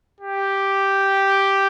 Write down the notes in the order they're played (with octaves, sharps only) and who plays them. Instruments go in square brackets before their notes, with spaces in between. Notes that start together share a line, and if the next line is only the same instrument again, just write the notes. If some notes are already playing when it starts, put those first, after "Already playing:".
[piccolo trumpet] G4